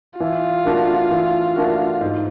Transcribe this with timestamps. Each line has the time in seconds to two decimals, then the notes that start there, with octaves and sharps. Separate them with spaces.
0.19 E3 F4
0.65 A3 D4 F#4 A#4
1.11 E3
1.56 A3 D4 F#4 A#4
2.01 G#2